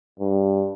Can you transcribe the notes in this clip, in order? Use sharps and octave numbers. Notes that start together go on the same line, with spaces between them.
G2